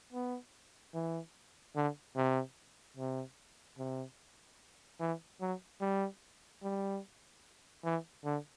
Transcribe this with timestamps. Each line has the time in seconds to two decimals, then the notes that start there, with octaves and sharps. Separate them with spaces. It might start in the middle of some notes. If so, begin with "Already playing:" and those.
0.12 B3
0.94 E3
1.76 D3
2.16 C3
2.97 C3
3.78 C3
5.00 E3
5.41 F#3
5.81 G3
6.63 G3
7.84 E3
8.25 D3